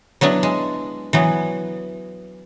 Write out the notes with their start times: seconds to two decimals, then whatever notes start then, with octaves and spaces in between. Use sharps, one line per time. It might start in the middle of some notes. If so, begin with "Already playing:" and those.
0.21 F#3 B3 D4 E4
0.43 G#3
1.13 E3 F#3 B3